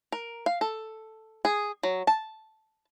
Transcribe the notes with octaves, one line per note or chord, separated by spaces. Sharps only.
A#4
F5
A4
G#4
F#3
A5